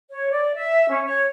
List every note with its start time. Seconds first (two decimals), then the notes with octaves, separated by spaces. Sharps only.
0.10 C#5
0.31 D5
0.55 E5
0.88 C#4
1.05 C#5